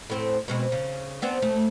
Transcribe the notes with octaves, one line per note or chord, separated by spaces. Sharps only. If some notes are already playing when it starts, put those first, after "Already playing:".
A2 C4
B2 G#3 C4
C#3
B3 C4 D4
A3